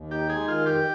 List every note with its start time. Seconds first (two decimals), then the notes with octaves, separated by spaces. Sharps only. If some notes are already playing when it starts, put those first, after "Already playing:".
Already playing: D#2
0.11 D#4 G4
0.29 G#3 G#4
0.48 D#3 F4
0.66 F2 G4